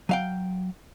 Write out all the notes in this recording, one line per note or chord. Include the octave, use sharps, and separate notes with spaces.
F#3 F5 G5